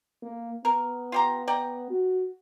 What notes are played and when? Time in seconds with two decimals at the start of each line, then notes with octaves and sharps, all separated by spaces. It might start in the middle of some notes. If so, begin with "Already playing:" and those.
0.23 A#3
0.65 B3 A#4
1.12 F4 G4 A#5
1.48 D5 G5 A#5
1.90 F#4